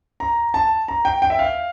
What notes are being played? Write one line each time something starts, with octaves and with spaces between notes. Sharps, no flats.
A#5
A5
A#5
G5
G5
E5
F5